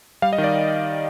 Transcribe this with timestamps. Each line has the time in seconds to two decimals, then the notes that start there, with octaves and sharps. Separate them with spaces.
0.22 G3 F5
0.33 D#5
0.38 D#3
0.44 D5